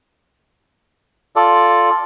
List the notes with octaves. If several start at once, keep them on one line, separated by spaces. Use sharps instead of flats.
F4 A4 D5